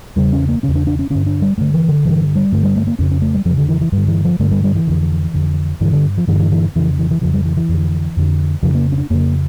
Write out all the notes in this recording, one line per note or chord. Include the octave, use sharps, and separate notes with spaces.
E2 C#3 G3
C#4
A#3
E2 C#3 C#4
D4
D4
C#4
G2 D3 C#4
D4
G3
G2 D3 A3
E3
D3
G2 D3 E3
G3
G2 D3 A3
G3
A3
A#3
F2 C#3 C#4
C#4
A3
G3
F2 C#3 F3
D3
E3
E3
G2 G3
D3
E3
F3
G2 D3 A3
G3
G3
E3
F2 D3
F2 D3
G2 D3 E3
D3
F3
G2 D3 E3
E3
E3
F2 C#3 E3
E3
E3
F2 C#3 F3
G3
E3
E3
F2 D3
F2 D3
F2 C#3 F3
A#3
C#4
D4
F2 C#3 A#3